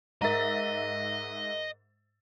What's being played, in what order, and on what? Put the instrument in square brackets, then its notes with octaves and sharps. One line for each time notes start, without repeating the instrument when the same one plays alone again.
[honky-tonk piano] G#2 E5 A6 [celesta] A#4 A#5 [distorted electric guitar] D#5